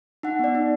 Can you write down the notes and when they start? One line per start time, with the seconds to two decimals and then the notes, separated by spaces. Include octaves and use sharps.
0.23 D#4 F#5
0.39 B3 D5
0.55 D#4